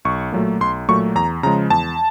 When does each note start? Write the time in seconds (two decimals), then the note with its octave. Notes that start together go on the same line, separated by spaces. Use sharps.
0.05 B1 C#6
0.32 A#2 F#3 A3
0.60 B1 C6
0.88 A#2 F#3 A3 C#6
1.15 E2 A#5
1.43 C#3 F3 G#3 A#5
1.70 E2 A5